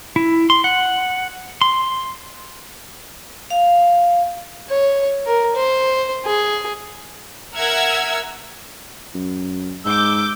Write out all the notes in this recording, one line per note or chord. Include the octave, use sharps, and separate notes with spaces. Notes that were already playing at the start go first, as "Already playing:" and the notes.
E4
C6
F#5
C6
F5
C#5
A#4
C5
G#4
A#4 E5 F#5 E6 F6 G#6
F#2
G#2 D6 E6 G6